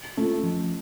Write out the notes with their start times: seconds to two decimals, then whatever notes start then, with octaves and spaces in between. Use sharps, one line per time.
0.17 A3 C#4 F4
0.43 F3